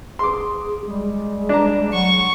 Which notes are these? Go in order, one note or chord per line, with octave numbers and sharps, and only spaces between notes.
G#4 C6 D6
G3 G#3
D4 A#5
F#3 F#5 C#6